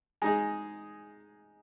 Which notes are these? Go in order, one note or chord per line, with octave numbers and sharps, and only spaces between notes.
G#3 D#4 G#4